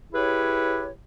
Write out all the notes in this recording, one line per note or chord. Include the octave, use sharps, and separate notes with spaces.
E4 G4 G#4 B4 C#5